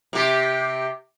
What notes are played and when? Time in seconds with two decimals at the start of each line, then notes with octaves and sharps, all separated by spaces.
0.13 C3 G4